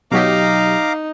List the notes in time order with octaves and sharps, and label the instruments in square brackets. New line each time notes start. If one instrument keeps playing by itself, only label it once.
[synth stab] B2 F#3 G4 [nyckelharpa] D#4 [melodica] F5 A#5 D6